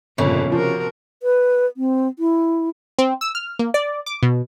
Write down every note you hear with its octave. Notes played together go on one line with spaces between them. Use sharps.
G1 F2 A#2 C#3
C3 F3 F#4 A#4
B4
C4
E4
C4
E6
F6
A#3
D5
D6
B2